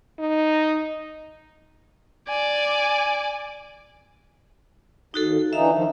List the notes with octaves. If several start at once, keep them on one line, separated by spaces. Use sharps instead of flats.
D#4
D5 G#5 D6
D#2 D#4 F#4 A4
D3 E3 D#4 E5 F5
D#3 F3